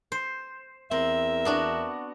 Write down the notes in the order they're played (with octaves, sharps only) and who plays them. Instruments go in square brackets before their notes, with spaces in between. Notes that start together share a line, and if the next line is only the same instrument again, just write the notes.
[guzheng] C5
[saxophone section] E2 A#4 E5 [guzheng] C4
[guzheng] B3 D4 F#4